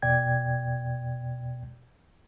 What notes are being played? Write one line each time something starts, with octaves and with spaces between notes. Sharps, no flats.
E2 B2 D5 G5 G#6